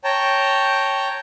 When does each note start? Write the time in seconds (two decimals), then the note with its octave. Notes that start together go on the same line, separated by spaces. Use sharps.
0.04 C#5 G5 A5 A#5